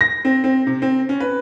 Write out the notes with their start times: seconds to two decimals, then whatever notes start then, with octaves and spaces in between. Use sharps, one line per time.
0.01 A#6
0.25 C4
0.44 C4
0.67 C3
0.82 C4
1.09 C#4
1.20 B4